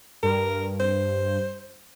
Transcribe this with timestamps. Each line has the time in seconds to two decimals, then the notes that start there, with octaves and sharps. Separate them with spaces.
0.23 G2 A#4
0.80 C5